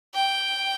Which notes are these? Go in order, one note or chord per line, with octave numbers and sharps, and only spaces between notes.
G5